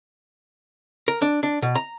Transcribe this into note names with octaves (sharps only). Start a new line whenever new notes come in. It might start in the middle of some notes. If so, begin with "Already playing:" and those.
A#4
D4
D4
B2
A#5